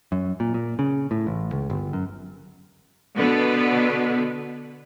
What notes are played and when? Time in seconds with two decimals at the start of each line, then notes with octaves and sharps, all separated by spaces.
0.12 F#2
0.40 A#2
0.54 A#2
0.79 C#3
1.11 A2
1.27 A1
1.52 C#2
1.70 G1
1.93 F#2
3.16 B2 D3 B3